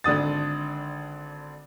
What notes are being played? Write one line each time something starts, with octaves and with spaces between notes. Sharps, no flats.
G#1 D3 D4 D#6 A6